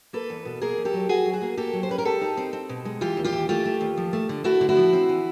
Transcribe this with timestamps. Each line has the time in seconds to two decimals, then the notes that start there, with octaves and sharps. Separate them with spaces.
0.13 A#3 A4 B4
0.30 E2
0.45 B2
0.62 A#3 G#4 A#4
0.77 E2
0.85 G4 A4
0.93 F#3
1.09 F#3 F#4 G#4
1.25 F#3
1.33 F#4 G#4
1.42 A#3
1.57 A#3 G4 A4
1.73 F#3
1.83 C5
1.89 C#4 B4
1.98 A#4
2.05 G#3 G4 A4
2.21 D#4
2.37 C4
2.53 C4
2.69 B2
2.85 G#3
3.01 E3 F4 G4
3.17 D#2
3.24 F4 G4
3.33 E3
3.49 A3 F4 G4
3.65 A3
3.81 D#2
3.97 F3
4.13 A3
4.29 D3
4.44 A3 E4 F#4
4.61 D3
4.69 E4 F#4
4.77 F3
4.93 C4
5.09 E3